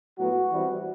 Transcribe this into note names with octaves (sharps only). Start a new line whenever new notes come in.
A2 F#3 B3 F#4
E3 G3 C4